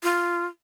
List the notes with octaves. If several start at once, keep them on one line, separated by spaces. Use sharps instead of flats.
F4